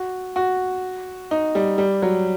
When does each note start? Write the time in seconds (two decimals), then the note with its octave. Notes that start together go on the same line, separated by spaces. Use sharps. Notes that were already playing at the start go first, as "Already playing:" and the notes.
Already playing: F#4
0.36 F#4
1.31 D#4
1.55 G3
1.78 G3
2.02 F#3